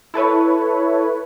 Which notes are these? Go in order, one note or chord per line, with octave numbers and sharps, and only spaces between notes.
E4 A4 B4 C#5